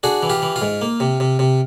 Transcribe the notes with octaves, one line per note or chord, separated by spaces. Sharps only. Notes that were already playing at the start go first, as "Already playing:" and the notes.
D4 F#4 G#4
E3
F4 G4
E3
F4
G#2
A#3
C3
C3
C3